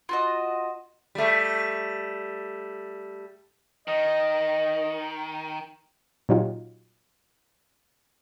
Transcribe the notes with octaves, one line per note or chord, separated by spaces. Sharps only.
F4 F#4 D#5
G3 A3
D#3 D#5
A#2 F#3 D#4 F4 G4